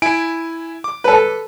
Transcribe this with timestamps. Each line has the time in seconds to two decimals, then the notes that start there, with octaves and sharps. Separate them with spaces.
0.02 E4 G#5 D7
0.84 D6
1.04 A4 B4